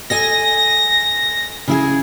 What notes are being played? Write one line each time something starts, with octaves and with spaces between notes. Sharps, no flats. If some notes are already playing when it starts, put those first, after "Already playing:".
A4 D#5 G#5 A#6
C#3 E4 G#4